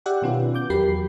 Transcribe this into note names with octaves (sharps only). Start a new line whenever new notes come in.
G4 D5 E5 F#5 G5
B2 D#3 C#4 F4 B4
D6 G6
E2 F#3 G4 A#4 B5 C7